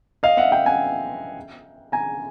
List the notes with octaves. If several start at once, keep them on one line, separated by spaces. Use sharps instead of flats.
D#5 F5
E5 F#5
F5 G5
F#5 G#5
G#5 A#5